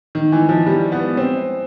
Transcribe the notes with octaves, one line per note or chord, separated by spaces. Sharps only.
D#3
E3
F3
G3
B3
C4